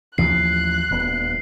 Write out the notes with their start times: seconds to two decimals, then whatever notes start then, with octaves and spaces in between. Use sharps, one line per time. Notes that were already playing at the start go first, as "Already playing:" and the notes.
0.18 A1 D#2 F3 F#6 C7
0.91 D#1 D2 B3